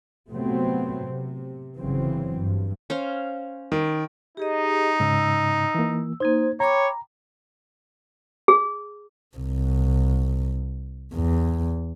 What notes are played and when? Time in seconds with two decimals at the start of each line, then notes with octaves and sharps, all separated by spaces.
0.30 C3 F#3 A3 B3 C4
1.06 C3
1.77 G1 C#3 E3 F#3 C4
2.39 G2
2.90 C#4 C5 F5
3.72 D#3
4.37 D#4 G4 G#4 D#5
5.00 G#2 C#3 E6
5.75 E3 A#3
6.20 A#3 D#4 C5 G#6
6.60 C#5 G5 A#5 B5 D6
8.48 G#4
9.37 C2
11.14 E2